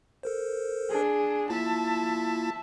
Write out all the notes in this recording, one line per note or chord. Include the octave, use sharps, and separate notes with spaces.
A4 A#4 C5
D4 G#4
A#3 E4 F4 E5 A5